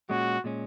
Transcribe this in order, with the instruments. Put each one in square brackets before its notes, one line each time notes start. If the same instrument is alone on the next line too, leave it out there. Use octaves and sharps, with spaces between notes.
[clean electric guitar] A#2 G#3 C#4 [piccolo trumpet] F#4
[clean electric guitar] A#2 G#3 C#4